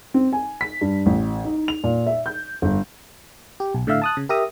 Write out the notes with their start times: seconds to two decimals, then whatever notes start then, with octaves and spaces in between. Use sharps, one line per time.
0.14 C4
0.33 G#5
0.61 B6
0.81 G2
1.06 A1
1.44 D#4
1.68 F7
1.84 A#2
2.07 E5
2.26 G6
2.62 G1
3.60 G4
3.75 B1
3.87 A2 D3 A3 E5 F5
4.02 A5 D#6 F#6
4.17 C#3
4.29 G4 A#4 E5 A#5 D#6